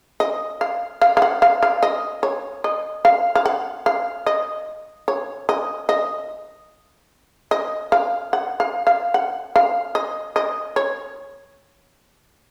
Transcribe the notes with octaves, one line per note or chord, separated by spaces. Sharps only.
D#5
F5
F5
F5
F#5
F5
F5
D#5
C#5
D#5
F5
F5
F#5
F5
D#5
C#5
D#5
D#5
D#5
F5
F#5
F5
F5
F#5
F5
D#5
D#5
C#5